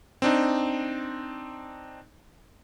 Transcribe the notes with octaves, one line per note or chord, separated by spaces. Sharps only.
C4 D4 D#4